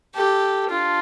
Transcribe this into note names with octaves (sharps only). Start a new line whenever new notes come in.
G4 A4
D4 F4